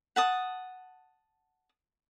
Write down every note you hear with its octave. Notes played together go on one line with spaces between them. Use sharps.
F#5 A5 D#6